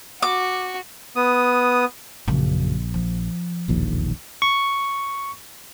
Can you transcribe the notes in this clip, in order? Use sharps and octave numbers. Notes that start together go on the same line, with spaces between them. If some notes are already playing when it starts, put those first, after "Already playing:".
F#4 D6
B3 D#6
A#1 F#2 C#3
F3
E1 A#1 D#2
C#6